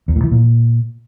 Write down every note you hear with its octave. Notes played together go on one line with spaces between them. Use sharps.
E2
A2
E3
A#2